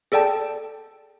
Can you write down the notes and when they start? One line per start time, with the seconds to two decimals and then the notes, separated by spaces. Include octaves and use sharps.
0.12 G#4 A4 D5 G5 A5